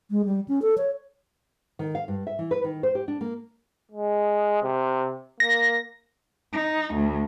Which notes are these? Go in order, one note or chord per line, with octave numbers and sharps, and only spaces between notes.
G#3
G3
C#4
A4
C#5
D#3
F5
G2
E5
E3
B4
D#3
C5
G4
D4
A#3
G#3
C3
A#3 A#6
D#4
D2